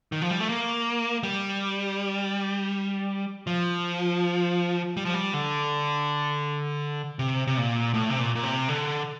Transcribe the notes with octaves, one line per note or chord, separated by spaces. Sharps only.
D#3
F3
G3
A3
A#3
G3
F3
G3
F3
G3
D3
C3
C3
A#2
A2
C3
A#2
A#2
C3
D3